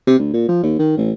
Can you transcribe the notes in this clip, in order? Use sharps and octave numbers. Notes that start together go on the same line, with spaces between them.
C3
D2
A#2
F3
D#2
D#3
A1